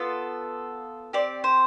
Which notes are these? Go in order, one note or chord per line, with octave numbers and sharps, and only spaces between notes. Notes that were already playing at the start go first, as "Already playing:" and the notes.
Already playing: B3 F4 A4
C4 G4 D5
C5